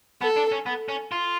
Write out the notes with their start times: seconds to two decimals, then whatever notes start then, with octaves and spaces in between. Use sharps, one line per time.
0.21 B3 A4
0.37 D4
0.52 C#4
0.66 B3
0.89 C#4
1.12 F4